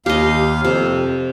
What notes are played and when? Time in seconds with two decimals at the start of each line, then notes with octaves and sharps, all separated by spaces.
0.06 D#2 G4 D#5 F5
0.65 F2 C3